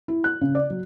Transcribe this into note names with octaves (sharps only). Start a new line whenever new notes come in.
E4
F#6
C#3
D5
F#3